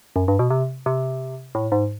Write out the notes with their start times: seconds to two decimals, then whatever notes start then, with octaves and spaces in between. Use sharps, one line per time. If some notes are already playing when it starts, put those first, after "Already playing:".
0.16 F#2
0.28 G2
0.39 B2
0.50 C3
0.86 C3
1.55 A2
1.72 G#2